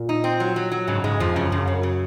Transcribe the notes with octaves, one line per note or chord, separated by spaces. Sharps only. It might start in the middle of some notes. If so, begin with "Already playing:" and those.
Already playing: A#2
D#4
C4
F#3
F#3
F#3
G#2 C#3
G#2 G#3
F2 F3
F#2 C#3
F#2 C#3
C#3
C#3